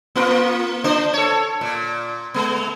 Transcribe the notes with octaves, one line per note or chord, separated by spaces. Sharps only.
A#3 F4 A#4
A#3 D4 C5
A4 C#5
A#2
G#3 B3